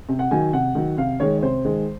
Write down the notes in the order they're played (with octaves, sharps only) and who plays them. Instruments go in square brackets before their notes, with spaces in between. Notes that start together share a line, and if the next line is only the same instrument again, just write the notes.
[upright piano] C3
F#5
D#3 F#3 G#5
C3 F#5
D#3 F#3
C3 F5
D#3 G#3 C#5
C#5
C3 C5
D#3 G#3